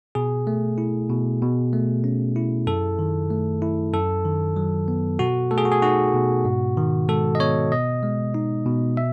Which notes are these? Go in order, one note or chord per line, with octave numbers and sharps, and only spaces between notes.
B2 G#4
A3
E4
B2
B2
A3
C#4
E4
F#2 A4
D#3
A3
E4
F#2 A4
D#3
F#3
B3
B2 F#4
A3 A4
G#4
F#4
G#4
D#4 F#4
B2
G#2
D#3
G#3 A4
D#5
B3 C#5
B2 D#5
G#3
D#4
B2
E5